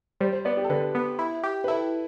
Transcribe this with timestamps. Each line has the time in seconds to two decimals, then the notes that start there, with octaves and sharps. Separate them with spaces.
0.20 G3 C5
0.33 C5
0.45 B3 D5
0.57 G4
0.65 A4
0.70 D3 B4
0.95 B3
1.19 E4
1.43 G4
1.64 B4
1.68 E4 A4